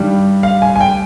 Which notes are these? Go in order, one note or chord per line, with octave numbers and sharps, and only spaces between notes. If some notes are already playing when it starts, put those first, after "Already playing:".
Already playing: G2 D#3 G3
F5
G#5
G#5
G5